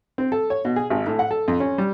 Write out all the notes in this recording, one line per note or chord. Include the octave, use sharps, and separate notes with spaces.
C4
A4
C#5
B2
G#4
G#1
A2
F#5
A4
F2
C#4
G3